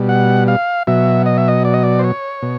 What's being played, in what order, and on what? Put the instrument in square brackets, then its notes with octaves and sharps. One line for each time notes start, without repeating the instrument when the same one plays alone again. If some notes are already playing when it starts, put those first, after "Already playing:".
Already playing: [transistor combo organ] B2 G3
F#5
F5
B2 F#3 E5
D#5
E5
D#5
D5
D#5
D5
C5
C#5
B2